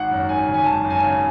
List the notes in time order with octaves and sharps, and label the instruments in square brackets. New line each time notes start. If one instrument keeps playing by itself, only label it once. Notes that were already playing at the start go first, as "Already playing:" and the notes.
Already playing: [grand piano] G#1 F#5
F#2
D#3 G#5
G#1
G#5
G#1 A5
F#2
G#5
C#3